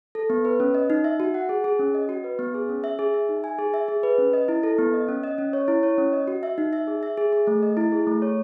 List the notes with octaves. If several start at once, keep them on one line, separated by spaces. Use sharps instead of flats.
A4
B3
B4
C#4
D#5
D#4
E5
F#4
F#5
G#4
G#4
C#4
D#5
F#4
B4
B3
G#4
C#4
E5
G#4
E5
D#4
G#5
G#4
E5
G#4
B4
C#4
D#5
E4
A4
B3
D#5
C#4
D#5
C#4
C#5
E4
C#5
C#4
D#5
F#4
E5
D#4
E5
G#4
E5
G#4
G#4
A3
D#5
E4
G#4
A3
C#5